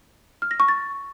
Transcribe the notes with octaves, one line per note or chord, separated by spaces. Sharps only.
F6
A#6
C#6
A6